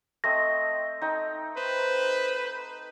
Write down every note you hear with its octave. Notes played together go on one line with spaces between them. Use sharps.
A3 C4 D#5 A#6
D#4 G5
B4 C5